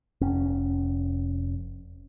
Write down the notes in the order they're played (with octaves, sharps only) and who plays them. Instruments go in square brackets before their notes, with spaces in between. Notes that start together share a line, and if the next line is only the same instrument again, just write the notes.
[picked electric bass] F1 C#4